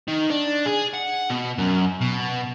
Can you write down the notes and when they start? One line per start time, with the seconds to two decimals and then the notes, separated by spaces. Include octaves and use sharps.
0.08 D#3
0.30 D4
0.66 G#4
0.94 F#5
1.30 B2
1.58 F#2
2.01 B2